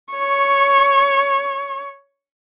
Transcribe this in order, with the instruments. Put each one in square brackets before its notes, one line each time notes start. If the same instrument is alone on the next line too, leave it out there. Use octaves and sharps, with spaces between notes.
[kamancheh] C#5 C#6